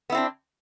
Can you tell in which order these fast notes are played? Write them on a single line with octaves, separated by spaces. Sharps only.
B3 E4 C4 D4